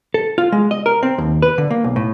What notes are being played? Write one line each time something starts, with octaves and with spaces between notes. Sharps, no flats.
A4
F4
G#3
D#5
A#4
C4
D#2
B4
D3
A#3
B1
A2